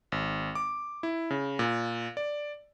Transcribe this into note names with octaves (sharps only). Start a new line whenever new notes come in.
G#1
D6
E4
C#3
A#2
D5